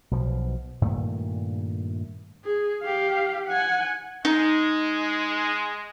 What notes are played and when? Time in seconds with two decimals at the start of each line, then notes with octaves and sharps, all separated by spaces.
0.11 B1 B2 F3
0.82 G2 A#2 D#3 A3
2.45 G#4
2.83 G4 F5
3.47 F#5 G#5
4.25 G#3 D#4